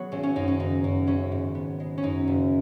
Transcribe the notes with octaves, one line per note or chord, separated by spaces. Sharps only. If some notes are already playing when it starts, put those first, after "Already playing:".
Already playing: F#3 B3 F#4 G#4
G#1 C#4
C#4
F#2 D#4
C#4
F#1 D#4
F#2
G#1 C#4
G#2
B3
G#3
C#4
F#2 D#4
F#1